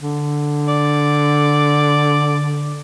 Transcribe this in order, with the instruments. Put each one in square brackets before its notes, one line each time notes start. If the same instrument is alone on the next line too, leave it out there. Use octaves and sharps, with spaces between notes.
[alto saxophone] D3
[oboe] D5